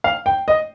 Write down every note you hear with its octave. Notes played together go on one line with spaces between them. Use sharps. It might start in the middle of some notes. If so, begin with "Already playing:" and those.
F5
G5
D#5